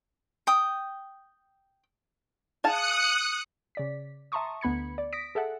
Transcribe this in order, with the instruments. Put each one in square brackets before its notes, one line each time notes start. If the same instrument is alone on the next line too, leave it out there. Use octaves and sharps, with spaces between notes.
[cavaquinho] G5 D#6
[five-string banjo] G#4 F5 A5 [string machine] D#6 F#6 C#7
[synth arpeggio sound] C#3 D5 B6
E5 A5 A#5 C6 C#6 D#6
D2 B3 B5 G#6 C#7
D5
D#6 A#6 B6 D7
G#4 A4 E5 F#5